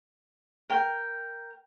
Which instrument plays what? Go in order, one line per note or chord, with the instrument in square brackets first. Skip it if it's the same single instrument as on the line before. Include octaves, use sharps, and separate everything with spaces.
[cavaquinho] A#4 G5